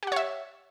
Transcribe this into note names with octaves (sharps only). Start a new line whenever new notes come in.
G4 C#5 E5 F#5